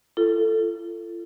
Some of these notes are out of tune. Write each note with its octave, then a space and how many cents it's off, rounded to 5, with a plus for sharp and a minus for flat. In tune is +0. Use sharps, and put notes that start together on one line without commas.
F4 -40 A4 +5